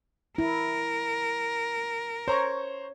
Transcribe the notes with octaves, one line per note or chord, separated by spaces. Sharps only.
E4 A#4
C5 C#5 A#5 C#6